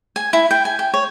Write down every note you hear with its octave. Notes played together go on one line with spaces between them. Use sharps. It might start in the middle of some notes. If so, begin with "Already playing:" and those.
G#5
E4
G5
G#5
G5
C#5